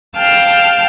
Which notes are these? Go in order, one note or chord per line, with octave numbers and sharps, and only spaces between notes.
F5 G5 A5 F6 G6